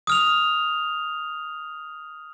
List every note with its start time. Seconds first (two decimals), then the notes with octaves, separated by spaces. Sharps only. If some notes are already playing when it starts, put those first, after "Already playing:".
0.07 D#6 F6 F7